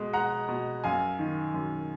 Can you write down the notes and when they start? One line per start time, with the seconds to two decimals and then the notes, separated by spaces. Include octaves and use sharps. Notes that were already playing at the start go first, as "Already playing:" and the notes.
Already playing: B2 G#3
0.13 G#3 F#5 A#5
0.49 B2
0.84 F#2 F5 G#5
1.19 D#3
1.54 F#2